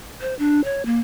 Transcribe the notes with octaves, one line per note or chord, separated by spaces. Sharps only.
C5
D4
C#5
A#3